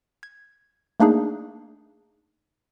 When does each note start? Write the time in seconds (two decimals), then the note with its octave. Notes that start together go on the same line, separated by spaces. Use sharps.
0.23 G#6
1.00 A3 A#3 D4 D#4 G#4